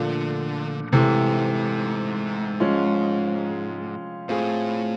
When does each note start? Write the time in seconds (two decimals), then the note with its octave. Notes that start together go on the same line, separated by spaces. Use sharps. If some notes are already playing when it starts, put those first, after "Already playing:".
Already playing: A#2 D3 F3 A3 D4
0.92 G#2 C3 E3 A3
2.60 F3 G#3 C#4 F4
4.29 A2 C4 F4 G#4